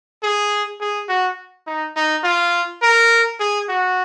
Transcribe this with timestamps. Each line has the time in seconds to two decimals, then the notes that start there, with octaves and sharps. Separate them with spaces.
0.23 G#4
0.81 G#4
1.09 F#4
1.67 D#4
1.96 D#4
2.24 F4
2.82 A#4
3.39 G#4
3.69 F#4